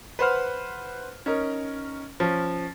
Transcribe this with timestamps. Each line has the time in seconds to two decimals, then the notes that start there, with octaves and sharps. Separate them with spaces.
0.19 B4 C5 F#5 F6
1.26 C#4 D#4 A#4
2.20 F3 C#4